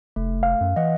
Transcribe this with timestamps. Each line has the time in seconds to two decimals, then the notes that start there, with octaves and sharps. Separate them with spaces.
0.16 F1 A3
0.43 F5
0.61 F#2
0.76 E3 D#5 F#5